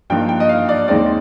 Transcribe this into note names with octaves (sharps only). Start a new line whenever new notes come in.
G2 F3 A#3 D#4 G5
G5
D#5
F5
D5
D#2 D#3 G#3 C4 D#4 D5